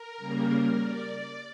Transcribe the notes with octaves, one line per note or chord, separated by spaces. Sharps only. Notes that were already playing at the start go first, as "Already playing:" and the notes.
Already playing: A#4
C#3 G3 A#3
D5